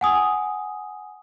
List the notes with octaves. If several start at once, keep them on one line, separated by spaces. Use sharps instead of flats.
F#5 G#5 D#6